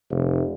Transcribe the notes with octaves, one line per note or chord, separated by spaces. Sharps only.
F1